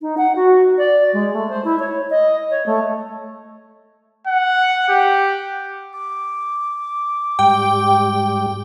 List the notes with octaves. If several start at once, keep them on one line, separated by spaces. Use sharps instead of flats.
D#4
F#5
F#4
D5
G#3
A3
C5
E4
C#5
D#5
C#5
A3
F#5
G4
D6
G#2 G3 G4 G5